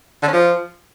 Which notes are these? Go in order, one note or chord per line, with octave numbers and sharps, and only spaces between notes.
D3
C#4
F3